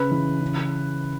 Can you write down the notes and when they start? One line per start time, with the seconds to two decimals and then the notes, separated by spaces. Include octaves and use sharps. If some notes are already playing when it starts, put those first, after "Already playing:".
Already playing: C#3 B4
0.11 E3
0.41 C#3